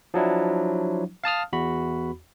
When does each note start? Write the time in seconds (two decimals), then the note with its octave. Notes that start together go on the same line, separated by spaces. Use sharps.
0.14 F3 F#3 D4 E4
1.24 F5 A5 D#6 F6
1.53 E2 F#4 B5